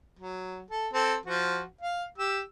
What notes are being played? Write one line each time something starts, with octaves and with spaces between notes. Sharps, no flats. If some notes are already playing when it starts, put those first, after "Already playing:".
F#3
A4
C4 A4
F3 F#4
F5
G4 E6